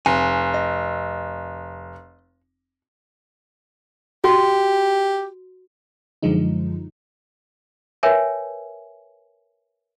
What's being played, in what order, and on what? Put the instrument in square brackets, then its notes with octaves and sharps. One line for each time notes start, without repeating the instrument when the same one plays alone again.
[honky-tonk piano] F1 [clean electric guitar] G#5
[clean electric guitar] D#5
[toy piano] F#4 [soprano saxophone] G4
[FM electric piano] F#2 D3 F3 G#3 D#4
[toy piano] A#4 B4 C#5 E5 G5 G#5